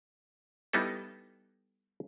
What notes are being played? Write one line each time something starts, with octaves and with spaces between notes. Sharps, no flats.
G3 B3 D#4 E4 A4